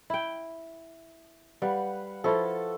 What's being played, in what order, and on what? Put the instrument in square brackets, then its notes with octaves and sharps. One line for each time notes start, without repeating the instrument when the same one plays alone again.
[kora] E4 G5
[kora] G3 [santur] B4 F5 F#5
[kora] F3 E4 F4 [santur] A4 C#6